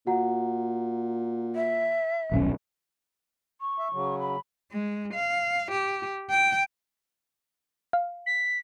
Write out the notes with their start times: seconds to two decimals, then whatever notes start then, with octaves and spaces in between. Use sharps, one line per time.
0.07 A#2 F#4 F#5 A#5
1.55 E5
2.32 D#1 B1 C#4
3.61 C#6
3.79 E5
3.92 C#3 F#3
4.20 B5
4.72 G#3
5.14 F5
5.71 G4
6.30 G5
7.93 F5
8.26 B6